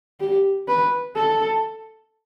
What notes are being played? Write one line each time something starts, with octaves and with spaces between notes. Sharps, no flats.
G4
B4
A4